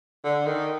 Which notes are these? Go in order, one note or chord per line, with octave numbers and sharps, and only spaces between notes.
D3
D#3